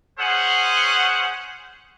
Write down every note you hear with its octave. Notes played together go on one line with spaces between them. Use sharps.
C#4 G#4 C5 F#5